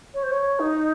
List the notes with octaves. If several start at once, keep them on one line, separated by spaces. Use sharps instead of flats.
C#5
C5
C#5
D#4